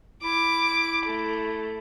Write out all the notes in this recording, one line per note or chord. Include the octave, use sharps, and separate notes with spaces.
E4 D6
A3